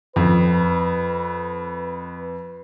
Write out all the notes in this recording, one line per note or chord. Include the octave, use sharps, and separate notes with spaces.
F2 B4